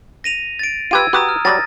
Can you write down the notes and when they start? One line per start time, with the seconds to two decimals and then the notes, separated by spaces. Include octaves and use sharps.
0.24 A#6 D#7 F7
0.59 A6 D7
0.91 F4 G4 B4 E6 G#6 D#7
1.13 F#4 G4 B4 A#5 D#6 F#6
1.29 F6
1.45 F#3 G3 D5 A6 A#6